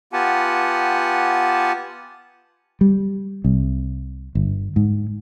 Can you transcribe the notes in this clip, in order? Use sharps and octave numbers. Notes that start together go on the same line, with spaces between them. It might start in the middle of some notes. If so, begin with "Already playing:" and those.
B3 F4 G4 F#5 G#5 A5
G3
C2
G1
G#2